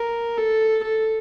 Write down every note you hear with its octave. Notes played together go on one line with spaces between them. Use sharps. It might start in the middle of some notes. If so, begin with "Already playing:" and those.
Already playing: A#4
A4
A4